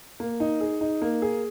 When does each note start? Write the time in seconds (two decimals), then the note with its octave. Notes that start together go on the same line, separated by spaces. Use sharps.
0.20 A#3
0.40 D#4
0.61 G#4
0.81 D#4
1.02 A#3
1.22 G#4